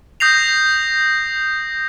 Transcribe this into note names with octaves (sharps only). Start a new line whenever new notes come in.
D#6 G6 A#6 C7 F7